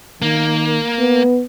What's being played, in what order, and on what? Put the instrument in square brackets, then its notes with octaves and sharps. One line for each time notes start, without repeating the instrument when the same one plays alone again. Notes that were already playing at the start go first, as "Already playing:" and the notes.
[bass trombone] D#3 [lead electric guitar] A#3
[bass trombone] B3